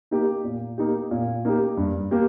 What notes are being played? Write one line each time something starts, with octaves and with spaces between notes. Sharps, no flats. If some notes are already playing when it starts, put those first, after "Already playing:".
A#3 D#4 G4
A#2
A#3 D#4 G4
A#2
A#3 D#4 G4
G2
A#3 G4